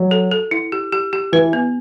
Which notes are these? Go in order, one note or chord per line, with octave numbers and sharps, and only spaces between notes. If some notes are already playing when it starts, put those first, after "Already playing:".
Already playing: F#3
A4
A4
E4
G4
G4
G4
E3 B4
B3